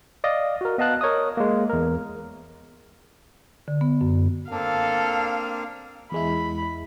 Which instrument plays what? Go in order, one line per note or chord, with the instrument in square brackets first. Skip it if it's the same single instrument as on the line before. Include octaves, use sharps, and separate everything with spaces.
[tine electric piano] D5 D#5 F5
F#4 A#4
B3 D#5 F5 A5 F#6
A#4 C#5 D#5 D#6
G#3 A#3
E2 A#4
[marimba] D3
B3
F#2
[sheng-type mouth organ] A#3 C4 D4 [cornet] A4 [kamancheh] F5
[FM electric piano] E2 G#3 E4 [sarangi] B5